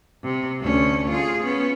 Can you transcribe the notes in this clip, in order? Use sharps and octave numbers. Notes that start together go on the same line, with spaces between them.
C3
D2 C#4
F4 G#4
B3 C#4